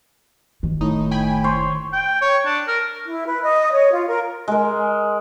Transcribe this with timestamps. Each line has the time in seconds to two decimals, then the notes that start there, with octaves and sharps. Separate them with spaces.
0.63 F#1 D#3
0.81 A2 D#4
1.11 G5 G#5 B5
1.44 C5 C#5 C6
1.93 G5
2.21 C#5
2.46 D4
2.68 A#4
3.06 E4
3.25 B4
3.42 D#5
3.71 C#5
3.92 F4
4.07 A#4
4.48 G#3 A#4